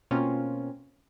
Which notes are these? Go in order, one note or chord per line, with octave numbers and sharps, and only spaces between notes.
B2 A#3 C4 C#4 F4